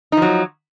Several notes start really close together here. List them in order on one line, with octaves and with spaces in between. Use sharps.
D#4 F3 F#3